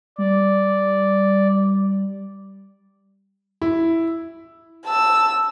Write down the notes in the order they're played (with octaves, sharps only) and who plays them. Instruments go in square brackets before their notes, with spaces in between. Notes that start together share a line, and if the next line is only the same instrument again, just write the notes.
[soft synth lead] G3 [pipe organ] D5
[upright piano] E4
[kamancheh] A5 E6